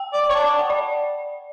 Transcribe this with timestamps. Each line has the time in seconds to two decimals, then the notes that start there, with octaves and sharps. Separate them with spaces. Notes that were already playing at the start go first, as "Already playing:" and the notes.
Already playing: G5
0.13 D5
0.29 C#5
0.35 D5 A5
0.47 A5
0.59 F#5
0.70 D5